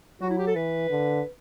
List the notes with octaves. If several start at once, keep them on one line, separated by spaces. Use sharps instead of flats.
F#3 F#4
E4
G4
A4
E3 B4
D3